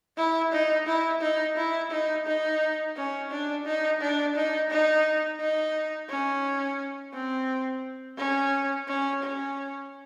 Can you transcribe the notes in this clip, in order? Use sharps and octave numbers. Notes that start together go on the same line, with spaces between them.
E4
D#4
E4
D#4
E4
D#4
D#4
C#4
D4
D#4
D4
D#4
D#4
D#4
C#4
C4
C#4
C#4
C#4